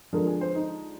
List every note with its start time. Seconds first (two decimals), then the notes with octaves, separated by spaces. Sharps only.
0.13 D3 F3 G#3 A#4
0.27 G#4
0.41 C5
0.55 D#4